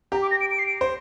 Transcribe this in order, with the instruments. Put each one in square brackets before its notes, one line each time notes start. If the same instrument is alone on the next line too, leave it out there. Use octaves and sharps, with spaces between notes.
[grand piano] G4 [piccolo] A#5
[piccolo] D6
A#6
D7
D7
C7
D7
[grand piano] C5